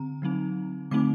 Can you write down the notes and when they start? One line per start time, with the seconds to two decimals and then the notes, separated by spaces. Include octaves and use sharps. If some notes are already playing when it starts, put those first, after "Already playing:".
Already playing: D3 C4 A#5
0.22 D3 F#3 C4 D#4
0.91 D3 F#3 A3 C4 D#4 D6